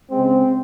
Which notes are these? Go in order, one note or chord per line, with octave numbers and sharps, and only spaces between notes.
G#3 C4
C#3